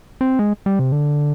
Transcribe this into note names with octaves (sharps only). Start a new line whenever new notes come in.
C4
G#3
G3
C3
D3